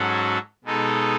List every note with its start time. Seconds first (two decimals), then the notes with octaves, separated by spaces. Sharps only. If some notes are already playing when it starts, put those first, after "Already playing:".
Already playing: G#2 F#3 C#4 F#4 A4
0.64 B2 G#3 D#4 A4